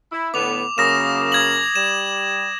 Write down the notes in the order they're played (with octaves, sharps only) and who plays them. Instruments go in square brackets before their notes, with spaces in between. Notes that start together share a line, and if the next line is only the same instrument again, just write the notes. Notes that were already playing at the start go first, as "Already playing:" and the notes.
[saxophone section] E4
[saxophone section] A2 D3 B3 [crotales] D6 F7
[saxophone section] F#2 C#3 A#3 [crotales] D#6 A#6 E7
[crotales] D#6 G#6 F#7
[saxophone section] G3 [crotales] E7